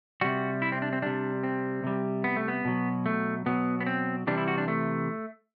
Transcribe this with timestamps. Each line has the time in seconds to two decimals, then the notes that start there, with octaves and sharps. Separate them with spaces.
0.21 C3 G3 F#4
0.62 E4
0.72 C4
0.82 D4
0.93 C4
1.02 C3 G3 D4
1.44 C4
1.84 C3 G3
2.24 B3
2.36 A3
2.48 B3
2.65 B2 F#3
3.06 A3
3.46 B2 F#3 B3
3.80 B3
3.87 C4
4.27 C3 E3 G3 D4
4.37 E4
4.48 F#4
4.58 D4
4.68 A3